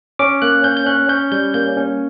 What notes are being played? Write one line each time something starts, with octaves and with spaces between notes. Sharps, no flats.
C#4 D6
A#3 F#6
C#4 G6
G6
C#4 F#6
C#4 G6
G3 G6
A#3 G6
C#4